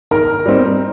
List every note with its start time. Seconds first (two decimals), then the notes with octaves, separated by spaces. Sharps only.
0.11 D#3 A#4 A#5
0.46 G3 C4 D#4